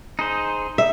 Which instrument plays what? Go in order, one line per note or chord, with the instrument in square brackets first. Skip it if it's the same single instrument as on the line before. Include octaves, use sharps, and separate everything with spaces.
[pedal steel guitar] D#4 G#4 C5
[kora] E5